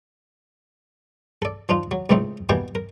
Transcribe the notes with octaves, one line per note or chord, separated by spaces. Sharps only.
A4 D5
F3 D4 D#4 F4
F#3
C#2 A2 F3 A3 C4 D#4
B2 E3 G3 A#3 G5 G#5
A#4